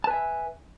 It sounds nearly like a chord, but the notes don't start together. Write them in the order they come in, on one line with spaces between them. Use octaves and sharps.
A5 B4 G#5 E5